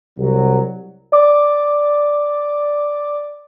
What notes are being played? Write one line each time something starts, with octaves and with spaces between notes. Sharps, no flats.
C2 F#3
D5 D6